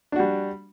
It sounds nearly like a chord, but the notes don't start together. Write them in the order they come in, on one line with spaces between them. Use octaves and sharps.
D4 F#4 G3